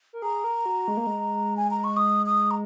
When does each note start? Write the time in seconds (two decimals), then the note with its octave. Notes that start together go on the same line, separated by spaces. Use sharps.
0.13 A#4
0.22 G#4 A#5
0.44 A#4
0.66 F#4
0.88 G#3
0.97 A#3
1.07 G#3
1.57 G#5
1.71 A#5
1.84 C#6
1.96 D#6
2.26 D#6
2.51 A#5